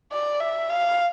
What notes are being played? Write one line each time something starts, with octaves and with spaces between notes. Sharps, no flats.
D5
E5
F5